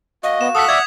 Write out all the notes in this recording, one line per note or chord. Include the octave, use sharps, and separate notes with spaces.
A#3 F#4 D#5
B3 E7
A4 F#5 D#6 B6
D5 E5 G#6